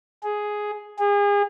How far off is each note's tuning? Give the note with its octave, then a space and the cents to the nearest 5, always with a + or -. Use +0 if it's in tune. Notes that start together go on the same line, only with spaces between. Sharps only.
G#4 +5
G#4 -35